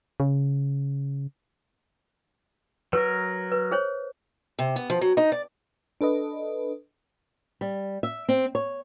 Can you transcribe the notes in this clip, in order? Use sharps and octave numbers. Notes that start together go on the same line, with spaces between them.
C#3
F#3 A#4 B4
B4
G#4 C5 C#5
C3
B3
F3
F#3
D#4
D5
D4 A4 B4 D#5
G3
E5
C4
C#5